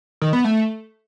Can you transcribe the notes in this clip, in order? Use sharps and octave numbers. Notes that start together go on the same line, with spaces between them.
D#3
B3
A3